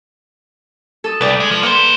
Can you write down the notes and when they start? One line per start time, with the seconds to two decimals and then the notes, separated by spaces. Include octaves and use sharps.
1.04 A4 D#6
1.21 C2 B4 D5
1.40 G#3
1.51 F3
1.63 A#3 C5 F#5 B5